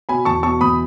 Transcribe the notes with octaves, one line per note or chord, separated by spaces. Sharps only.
B2 G#5 B5
E2 A5 C#6
B2 A5 C#6
E2 B5 D#6